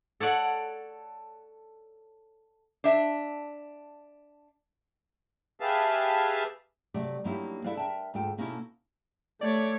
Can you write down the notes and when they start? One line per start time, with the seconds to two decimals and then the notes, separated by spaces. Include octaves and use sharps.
0.20 A4 C#5 D5 F#5
2.84 D4 E5
5.60 G4 G#4 B4 E5 F5 A5
6.94 C3 F#3 A3 D5 E5
7.24 G2 F#3 A#3 D#4 E4 G4
7.64 E4 A4 B4 D5 F5
7.77 A#4 B4 E5 G5 A5
8.14 D2 G#2 F4 A4 G5
8.38 B2 A#3 C#4 D#4 E4 A4
9.41 A3 C#5 D5